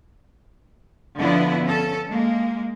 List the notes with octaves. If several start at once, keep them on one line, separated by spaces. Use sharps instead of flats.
D3 F3 B3 D4 E4
C#4 A4
G#3 A#3